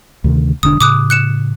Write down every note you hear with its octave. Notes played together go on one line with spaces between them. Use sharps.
D2 C3 D#3
E1 D3 D4 D#6
A2 C#3 D6 D#6 F#6
F#6 C#7 E7